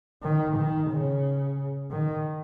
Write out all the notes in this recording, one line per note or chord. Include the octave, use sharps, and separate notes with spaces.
D#3
D#3
C#3
D#3